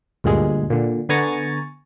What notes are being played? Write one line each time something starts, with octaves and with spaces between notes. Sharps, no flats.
D2 G2 A#2 G#3 G#4
A#2 D3
D3 B3 G#5 A#5 C#6 A6